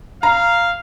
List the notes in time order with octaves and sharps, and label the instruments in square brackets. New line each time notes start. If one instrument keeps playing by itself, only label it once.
[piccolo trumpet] F5 [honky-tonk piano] A#5